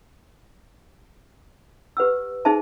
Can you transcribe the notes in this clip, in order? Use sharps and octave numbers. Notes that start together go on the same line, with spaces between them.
G4 B4 F#5 E6
D#4 G#4 C5 E5 A5